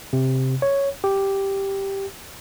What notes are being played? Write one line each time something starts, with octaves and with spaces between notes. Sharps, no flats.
C3
C#5
G4